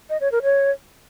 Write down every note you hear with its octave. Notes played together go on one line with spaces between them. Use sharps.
D#5
C#5
A#4
C#5